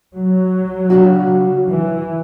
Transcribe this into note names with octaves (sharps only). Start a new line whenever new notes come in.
F#3
C#3 G3 D4 F#4
E3